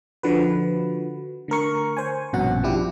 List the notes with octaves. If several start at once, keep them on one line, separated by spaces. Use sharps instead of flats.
D3 F3 F#4 B4
D3 A3 A#4 C#6
C5 G#5
A#1 G2 B2 C#4 F#4 F#5
F3 D4 E4 G4